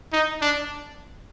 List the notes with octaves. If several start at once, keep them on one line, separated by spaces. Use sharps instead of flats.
D#4
D4